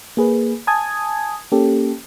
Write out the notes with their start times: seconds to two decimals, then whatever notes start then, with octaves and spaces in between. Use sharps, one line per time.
0.17 A#3 G#4 B4
0.67 G#5 A5 D#6 G#6
1.52 A#3 C#4 G4 A4